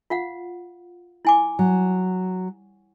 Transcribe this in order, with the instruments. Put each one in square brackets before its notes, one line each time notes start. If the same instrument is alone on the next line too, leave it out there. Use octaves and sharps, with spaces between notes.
[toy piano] F4 F5 F#5
E4 G#5 D6
[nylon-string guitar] F#3